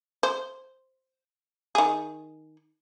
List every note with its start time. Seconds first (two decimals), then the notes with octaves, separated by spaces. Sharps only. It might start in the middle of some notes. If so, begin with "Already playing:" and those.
0.23 C5
1.75 D#3 G#4